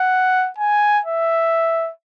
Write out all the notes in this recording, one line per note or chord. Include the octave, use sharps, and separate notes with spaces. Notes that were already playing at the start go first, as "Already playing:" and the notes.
Already playing: F#5
G#5
E5